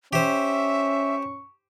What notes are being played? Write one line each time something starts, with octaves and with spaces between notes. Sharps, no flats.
C#4 G4 C5 E5 C#6